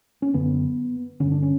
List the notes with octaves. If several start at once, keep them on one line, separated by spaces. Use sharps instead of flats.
C#4
F#2 D3 B3
G2 D3 C#4
D4
C#4